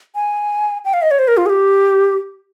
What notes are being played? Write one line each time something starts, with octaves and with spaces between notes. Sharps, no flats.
G#5
G5
F5
D#5
C#5
C5
A#4
F4
G#4
G4